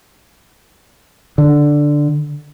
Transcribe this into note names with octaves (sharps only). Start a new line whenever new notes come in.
D3